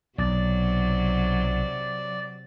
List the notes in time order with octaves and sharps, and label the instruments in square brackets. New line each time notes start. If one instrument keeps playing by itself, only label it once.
[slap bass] B1 [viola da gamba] C3 F#3 [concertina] D5